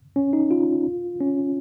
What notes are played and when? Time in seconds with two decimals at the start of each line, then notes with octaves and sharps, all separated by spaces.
0.16 C#4
0.33 D#4
0.51 F4
1.21 C#4